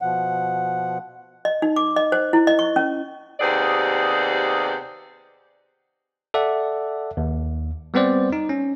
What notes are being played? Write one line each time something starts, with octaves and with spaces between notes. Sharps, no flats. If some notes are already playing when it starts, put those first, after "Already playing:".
B2 F3 F#5
D#5
D#4
D6
D#5
C5
E4
D#5
C#6
C#4
D#2 C3 B3 G#4 C5 D5
A4 D5 E5 F#5
D#2
G3 B3 C4 C5 D5
D#4
C#4